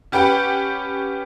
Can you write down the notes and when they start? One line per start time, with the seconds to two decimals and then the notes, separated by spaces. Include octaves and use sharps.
0.12 C#4 G4 B4 F#5 G5